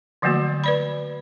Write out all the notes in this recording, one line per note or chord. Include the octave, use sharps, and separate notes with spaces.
D3 F3 F#3 A3 A#3 F#4
B4 D5 B5